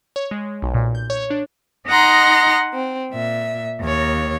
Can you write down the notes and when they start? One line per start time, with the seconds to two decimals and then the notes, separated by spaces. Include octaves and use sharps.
0.16 C#5
0.31 G#3
0.62 B1
0.74 A#2
0.95 G6
1.10 C#5
1.30 D4
1.88 D#4 D#5 F#5 A#5 C6
2.72 C4
3.13 A#2 E5
3.79 D#2 C#5